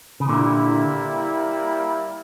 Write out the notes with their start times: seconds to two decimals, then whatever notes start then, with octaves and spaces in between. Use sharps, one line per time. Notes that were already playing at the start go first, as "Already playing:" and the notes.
0.20 C#3
0.29 A#2 D3 G3 A#3 E4